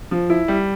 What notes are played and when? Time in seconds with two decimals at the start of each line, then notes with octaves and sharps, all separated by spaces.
0.11 F3
0.30 E4
0.48 G3